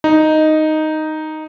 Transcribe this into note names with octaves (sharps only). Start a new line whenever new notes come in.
D#4